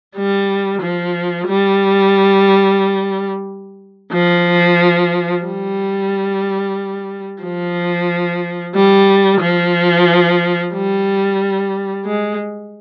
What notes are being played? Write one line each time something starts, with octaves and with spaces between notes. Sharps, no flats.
G3
F3
G3
F3
G3
F3
G3
F3
G3
G#3